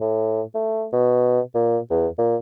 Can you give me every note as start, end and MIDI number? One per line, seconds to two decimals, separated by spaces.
0.01 0.42 45
0.55 0.86 57
0.93 1.40 47
1.55 1.79 46
1.90 2.07 40
2.18 2.37 46